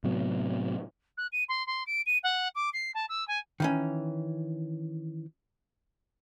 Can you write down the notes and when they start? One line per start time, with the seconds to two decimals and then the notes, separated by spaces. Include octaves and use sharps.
0.04 A2 C3 F#3 B3
1.17 F#6
1.32 D#7
1.48 C6
1.67 C6
1.86 D7
2.06 D#7
2.23 F#5
2.55 D6
2.73 C7
2.94 A5
3.09 E6
3.27 G#5
3.60 D#3 E3 C#4